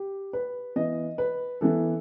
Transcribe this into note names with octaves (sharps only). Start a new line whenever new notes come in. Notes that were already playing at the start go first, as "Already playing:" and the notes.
Already playing: G4
B4
E3 B3 D#5
B4
E3 B3 A4